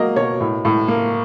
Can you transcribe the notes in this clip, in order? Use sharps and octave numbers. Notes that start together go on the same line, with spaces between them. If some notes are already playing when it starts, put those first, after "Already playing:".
Already playing: F#3 A#3 D#5
B2 C#5
A2
A2
A#3